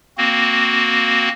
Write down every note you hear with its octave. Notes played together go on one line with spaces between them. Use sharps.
A#3 C4 F#4